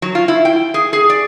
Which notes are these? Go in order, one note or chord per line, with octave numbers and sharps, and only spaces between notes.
F#3
F4
E4
G5
G#4
G#4
D5